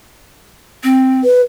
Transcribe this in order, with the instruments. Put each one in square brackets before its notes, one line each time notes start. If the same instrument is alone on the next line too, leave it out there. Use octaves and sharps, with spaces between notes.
[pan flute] C4
[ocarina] B4